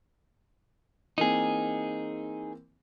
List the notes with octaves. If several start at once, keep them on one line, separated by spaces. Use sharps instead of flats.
E3 A#3 C4 D#4 G#4